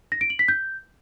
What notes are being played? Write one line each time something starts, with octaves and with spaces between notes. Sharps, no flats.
A#6
D7
F#7
B6
G6